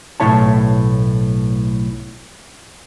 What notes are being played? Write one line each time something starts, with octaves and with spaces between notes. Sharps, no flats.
B1 A2 F3 E4 C#5 A5